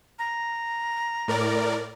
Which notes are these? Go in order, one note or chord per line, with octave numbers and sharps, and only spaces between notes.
A#5
A2 A#4 D5